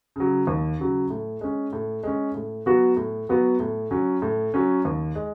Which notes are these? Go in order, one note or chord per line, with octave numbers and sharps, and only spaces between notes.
C#3 F#3
D#2
C#3 F#3
A2
G#3 C#4
A2
G#3 C#4
A2
F#3 B3 F#4
A2
F#3 B3 F#4
A2
F#3 C#4
A2
F#3 C#4
D#2
G#3